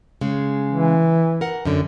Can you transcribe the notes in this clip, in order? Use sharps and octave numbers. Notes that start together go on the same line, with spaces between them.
C#3 G#3
E3
A#4 F#5
F#2 D3